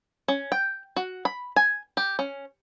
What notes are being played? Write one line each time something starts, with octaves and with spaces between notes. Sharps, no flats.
C#4
G5
F#4
B5
G#5
G4
C#4